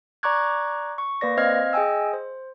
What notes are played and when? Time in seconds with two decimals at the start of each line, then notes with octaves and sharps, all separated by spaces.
0.23 D5 A#5 C#6 D6 F#6 G#6
0.98 C#6
1.21 A#3 B4 D5 A#6
1.37 C4 C5 D#5 F5 F6 G#6
1.73 G#4 D#5 G5 G#5 E6
2.13 C5